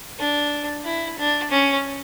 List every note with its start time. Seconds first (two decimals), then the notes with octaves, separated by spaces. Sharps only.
0.19 D4
0.84 E4
1.18 D4
1.51 C#4